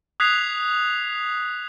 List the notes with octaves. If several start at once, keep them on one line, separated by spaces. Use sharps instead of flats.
D#6 F#6 G#6 B6 C7 F7